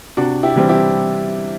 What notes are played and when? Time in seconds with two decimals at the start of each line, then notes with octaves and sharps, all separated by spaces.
0.17 C3 D4 F#4
0.43 E4 G4
0.56 E3 G3 C4
0.69 E4 G4